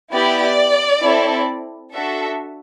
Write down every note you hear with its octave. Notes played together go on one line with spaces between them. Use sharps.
B3 E4 G4 D5
C4 E4 A4
D4 F#4 A4 E5